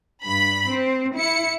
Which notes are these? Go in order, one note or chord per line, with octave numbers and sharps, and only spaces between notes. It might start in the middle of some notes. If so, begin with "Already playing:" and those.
G2 B5
C4
E4 C#7